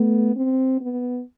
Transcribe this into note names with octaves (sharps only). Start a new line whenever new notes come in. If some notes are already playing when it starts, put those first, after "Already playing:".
Already playing: A3 B3
C4
B3